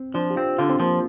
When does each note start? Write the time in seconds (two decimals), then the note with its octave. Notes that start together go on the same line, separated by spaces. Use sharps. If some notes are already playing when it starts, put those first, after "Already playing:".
Already playing: C4
0.14 F3 D4
0.30 G4
0.36 C4 F4
0.58 D3 F4
0.70 C4
0.80 F3 A#3